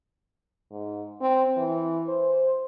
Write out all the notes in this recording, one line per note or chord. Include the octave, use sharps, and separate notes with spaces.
G#2
C4
E3
C5